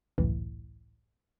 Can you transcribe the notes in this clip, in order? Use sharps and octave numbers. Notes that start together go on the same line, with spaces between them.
G#1 C#2 F#2 A2 E3